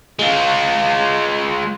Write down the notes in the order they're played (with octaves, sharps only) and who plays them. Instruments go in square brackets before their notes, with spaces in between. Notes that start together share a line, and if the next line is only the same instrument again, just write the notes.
[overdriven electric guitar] G#3 F4